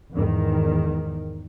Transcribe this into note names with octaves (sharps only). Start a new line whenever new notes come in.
E2 G#2 D#3